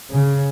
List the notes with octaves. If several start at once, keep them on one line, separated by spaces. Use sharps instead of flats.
C#3